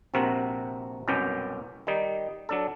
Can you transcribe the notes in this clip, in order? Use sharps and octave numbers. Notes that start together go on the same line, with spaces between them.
A#1 C3 C4 F#4 A#4 F#5
C2 F#2 B2 C#4 G4 G5
D#3 G3 D#4
F#3 D4 A4